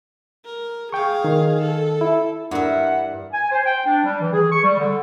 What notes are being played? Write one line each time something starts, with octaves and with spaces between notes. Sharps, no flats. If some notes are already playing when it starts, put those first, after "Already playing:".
A#4
G#4 F5 G5 C#6
D#3
A4
E4
G2 D4 E4 A#4 E5 F#5
G#5
C5
G5
D4
G3
E3
G#4
C#6
G3
D3